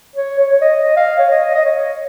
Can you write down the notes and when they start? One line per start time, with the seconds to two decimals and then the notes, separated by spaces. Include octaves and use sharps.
0.16 C#5
0.39 C#5
0.53 C#5
0.61 D#5
0.97 F5
1.19 C#5
1.30 D#5
1.55 D#5
1.65 C#5